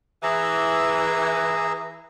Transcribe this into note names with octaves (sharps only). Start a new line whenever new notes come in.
E3 G#4 A#5 E6